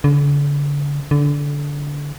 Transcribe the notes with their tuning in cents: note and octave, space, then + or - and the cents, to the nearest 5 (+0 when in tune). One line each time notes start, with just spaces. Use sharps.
D3 -40
D3 -20